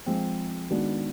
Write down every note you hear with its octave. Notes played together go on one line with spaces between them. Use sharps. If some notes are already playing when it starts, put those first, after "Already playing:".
F3 G#3 C4
D#3 G#3 B3 D4 F#4